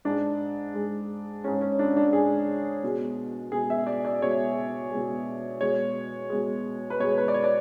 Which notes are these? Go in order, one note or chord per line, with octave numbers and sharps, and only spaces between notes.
G#2 G#3 D4
G#2 G#3
G#2 G#3 C#4
C#4
D4
D4
G#2 G#3 G#4
B2 G#3
B2 G#3 G#4
E5
D5
D5
B2 G#3 C#5
B2 G#3
B2 G#3 C#5
B2 G#3
B4
B2 G#3 C#5
B4
D5
C#5
D5